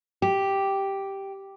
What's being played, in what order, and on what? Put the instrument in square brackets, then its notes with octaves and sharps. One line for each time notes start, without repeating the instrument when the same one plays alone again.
[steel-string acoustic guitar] G4